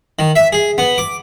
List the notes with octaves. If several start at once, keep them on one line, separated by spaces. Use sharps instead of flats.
D#3
E5
G#4
B3
D6